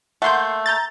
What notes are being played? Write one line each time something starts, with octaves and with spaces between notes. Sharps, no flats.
A3 A#3 F#5 C6 G6
A#5 G6 A6